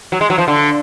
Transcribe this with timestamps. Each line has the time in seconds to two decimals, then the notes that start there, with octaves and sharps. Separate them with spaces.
0.12 F#3
0.21 G#3
0.30 F#3
0.38 F3
0.48 D3